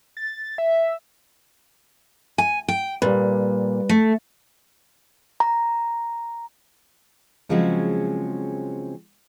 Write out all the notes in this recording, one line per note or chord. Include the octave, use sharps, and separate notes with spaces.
A6
E5
G#5
G5
A#2 G3 B4
A3
A#5
C#3 F3 F#3 G#3 C4 C#4